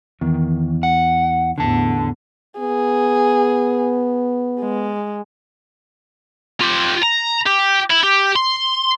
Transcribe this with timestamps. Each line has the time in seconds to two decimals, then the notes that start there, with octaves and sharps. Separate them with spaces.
0.21 E2 D#3
0.83 F#5
1.58 A1 E2 D3 A5
2.60 B3 G#4
4.60 G#3
6.60 F4 G4
7.02 A#5
7.46 G4
7.90 E4
8.04 G4
8.36 C6